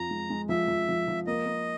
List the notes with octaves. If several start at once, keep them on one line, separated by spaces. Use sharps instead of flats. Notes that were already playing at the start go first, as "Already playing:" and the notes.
Already playing: F2 F3 A#5
G#3
G#3
F3 E5
F3
F3
F3
A#3 D#5
A#3